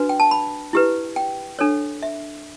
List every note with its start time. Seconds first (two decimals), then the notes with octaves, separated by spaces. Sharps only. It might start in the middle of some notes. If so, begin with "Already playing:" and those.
Already playing: D4 F#4 B4
0.09 G5
0.20 A5
0.31 B5
0.73 E4 G4 B4
1.16 G5
1.59 D4 A4 C#5
2.03 E5